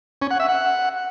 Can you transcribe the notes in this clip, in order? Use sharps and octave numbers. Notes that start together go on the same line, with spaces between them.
C#4
F#5
E5
F#5